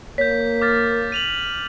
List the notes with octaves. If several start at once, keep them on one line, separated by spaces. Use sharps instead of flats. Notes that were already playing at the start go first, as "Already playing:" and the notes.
A#3 C#5 G6 B6
D6 F6 A6
D#7 F7 F#7